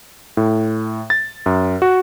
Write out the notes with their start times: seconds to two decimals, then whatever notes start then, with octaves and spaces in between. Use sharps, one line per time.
0.37 A2
1.10 A6
1.46 F#2
1.82 F#4